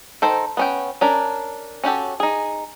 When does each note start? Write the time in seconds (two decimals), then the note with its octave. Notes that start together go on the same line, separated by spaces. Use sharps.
0.22 D#3 A4 C5
0.57 B3 C#4 G5
1.01 C#4 D4 A#4
1.84 C#4 F#4 G4 A4
2.20 D#4 G#4